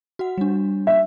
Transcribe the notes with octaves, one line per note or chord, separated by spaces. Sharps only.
F#4 F#5
G3 D4
E5